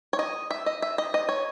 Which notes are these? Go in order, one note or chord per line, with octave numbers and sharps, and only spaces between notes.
C#5
D#5
E5
D#5
E5
D#5
D#5
C#5